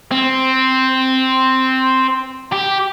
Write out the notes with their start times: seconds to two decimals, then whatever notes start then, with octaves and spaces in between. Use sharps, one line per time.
0.11 C4
2.53 G4